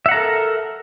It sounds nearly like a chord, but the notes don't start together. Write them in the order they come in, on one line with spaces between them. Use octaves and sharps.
E5 F#5 A#5 A4 A#4